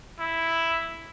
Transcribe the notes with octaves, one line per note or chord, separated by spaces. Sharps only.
E4